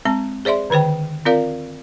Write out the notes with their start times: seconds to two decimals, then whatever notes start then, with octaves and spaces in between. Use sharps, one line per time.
0.05 G#3 C4 A5
0.45 G#4 C5 D5 E5 C6
0.70 D3 D#3 B4 C5 G5
1.25 C4 F4 A#4 D5 F5